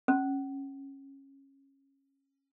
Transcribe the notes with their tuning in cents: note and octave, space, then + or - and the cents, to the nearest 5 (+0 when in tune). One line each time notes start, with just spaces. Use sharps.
C#4 -20